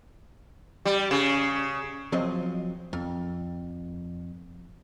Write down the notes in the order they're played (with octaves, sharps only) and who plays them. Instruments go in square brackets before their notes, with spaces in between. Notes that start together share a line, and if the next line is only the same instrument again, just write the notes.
[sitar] G3
C#3
[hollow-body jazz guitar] F3 F#3 C4 D#5
F2